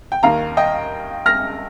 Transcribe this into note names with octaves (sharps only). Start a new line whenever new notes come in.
G5
D#2 D#3 A#3 F5 A#5
D#5 G5
F6 A#6